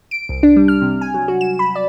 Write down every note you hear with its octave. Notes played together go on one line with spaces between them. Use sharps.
D7
C2
D4
G3
F6
C3
G#5
F#3
F#4
E7
B5
D5